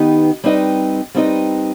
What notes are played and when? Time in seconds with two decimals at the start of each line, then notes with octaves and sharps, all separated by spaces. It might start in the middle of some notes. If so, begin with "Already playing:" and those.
Already playing: D#3 B3 D#4 G4 B4
0.44 G3 C4 D#4 B4 D#5
1.14 G3 C4 D#4 B4 D#5